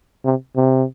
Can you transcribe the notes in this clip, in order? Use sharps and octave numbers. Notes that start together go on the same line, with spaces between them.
C3
C3